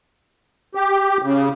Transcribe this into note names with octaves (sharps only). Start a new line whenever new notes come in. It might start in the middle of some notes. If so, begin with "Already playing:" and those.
G4
C#3